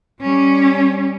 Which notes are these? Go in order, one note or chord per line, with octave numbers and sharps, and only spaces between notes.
G3 C#4